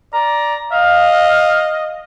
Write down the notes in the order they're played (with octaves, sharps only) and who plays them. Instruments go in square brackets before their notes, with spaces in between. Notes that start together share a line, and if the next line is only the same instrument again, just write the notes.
[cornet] D5 [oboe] A#5
[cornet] D#5 [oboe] F5